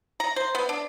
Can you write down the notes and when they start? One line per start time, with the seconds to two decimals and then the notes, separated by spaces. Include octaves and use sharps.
0.20 A#5
0.36 C5
0.55 B3
0.69 D4